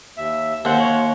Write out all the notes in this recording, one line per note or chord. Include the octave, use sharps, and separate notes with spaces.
D#2 E5
D#2 C5 F#5
C#5